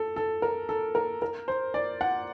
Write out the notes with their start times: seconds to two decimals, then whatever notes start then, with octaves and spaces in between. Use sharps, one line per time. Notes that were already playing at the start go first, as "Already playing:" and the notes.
Already playing: A4
0.16 A4
0.42 A#4
0.69 A4
0.95 A#4
1.22 A#4
1.48 C5
1.74 D5
2.01 F#5